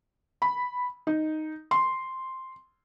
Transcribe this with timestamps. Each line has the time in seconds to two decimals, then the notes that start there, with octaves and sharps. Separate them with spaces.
0.42 B5
1.07 D#4
1.71 C6